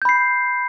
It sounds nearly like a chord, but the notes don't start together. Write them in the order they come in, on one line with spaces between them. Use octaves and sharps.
G6 B5 C7